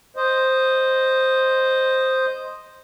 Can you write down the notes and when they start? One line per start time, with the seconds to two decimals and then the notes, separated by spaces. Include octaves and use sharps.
0.16 C5 D#5